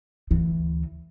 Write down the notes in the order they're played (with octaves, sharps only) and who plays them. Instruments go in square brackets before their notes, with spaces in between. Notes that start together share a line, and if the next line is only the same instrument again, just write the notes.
[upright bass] D2 E3